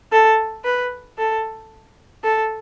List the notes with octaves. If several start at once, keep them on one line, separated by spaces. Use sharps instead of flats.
A4
B4
A4
A4